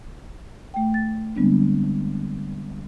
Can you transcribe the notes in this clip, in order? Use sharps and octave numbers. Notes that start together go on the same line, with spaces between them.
A3 G5
A6
D3 G3 G#3 B3 C4 D4